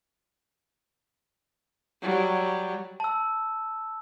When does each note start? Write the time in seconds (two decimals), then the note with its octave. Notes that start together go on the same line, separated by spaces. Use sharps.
2.02 F#3 G3
3.00 A5 E6